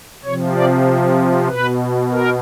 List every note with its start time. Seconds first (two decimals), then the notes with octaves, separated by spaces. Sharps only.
0.24 C3 F3 C#5
0.56 D5
1.48 B2 B4
2.11 A#4